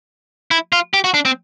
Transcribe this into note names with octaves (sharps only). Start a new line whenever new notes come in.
E4
F4
G4
F#4
D4
C4